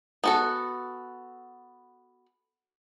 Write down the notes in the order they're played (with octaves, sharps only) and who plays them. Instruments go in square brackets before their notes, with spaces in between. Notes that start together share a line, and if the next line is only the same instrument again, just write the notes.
[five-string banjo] B3 F#4 A4